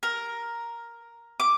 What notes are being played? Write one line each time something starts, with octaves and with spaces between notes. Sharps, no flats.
A#4
D6